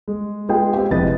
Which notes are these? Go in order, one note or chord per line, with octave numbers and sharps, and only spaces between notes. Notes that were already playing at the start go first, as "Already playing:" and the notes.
G#3
G#3 B3 F4 G#4 G5
C4 G4
F1 F2 E4 B4 D#5 A6